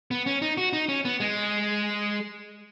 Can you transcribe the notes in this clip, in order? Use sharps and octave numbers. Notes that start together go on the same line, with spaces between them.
B3
C#4
D#4
F#4
D#4
C#4
B3
G#3